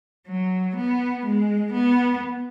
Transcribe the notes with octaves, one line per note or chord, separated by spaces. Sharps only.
F#3
B3
G#3
B3